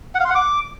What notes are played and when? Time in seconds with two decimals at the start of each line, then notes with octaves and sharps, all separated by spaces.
0.15 F#5
0.20 F5
0.25 C6
0.30 F#5
0.35 D6